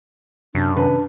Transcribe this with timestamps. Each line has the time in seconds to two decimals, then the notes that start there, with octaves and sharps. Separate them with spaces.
0.55 F#2 C3 D4
0.76 C3 D#3 C#4 D4 B4